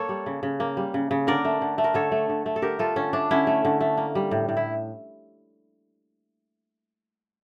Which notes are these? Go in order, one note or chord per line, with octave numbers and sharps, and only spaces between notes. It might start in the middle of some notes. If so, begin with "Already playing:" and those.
Already playing: A#3 A4 C#5
G3
C#3
C#3
A#3
G3
C#3
C#3
D3 A#4 D5
A3
D3
A3
A#4
D3 A4 C#5
A3
D3
A3
A4
D3 G4 A#4
A3 F4 A4
D3 C#4
A3 D4
D3 C#4 E4
A3
D3
A3
A#3
G3
A2
A2
E4